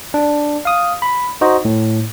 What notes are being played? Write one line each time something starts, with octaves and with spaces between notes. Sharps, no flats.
D4
F5 D#6
B5
D#4 F#4 C5 D#5
A2